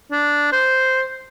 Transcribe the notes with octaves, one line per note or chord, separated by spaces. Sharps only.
D4
C5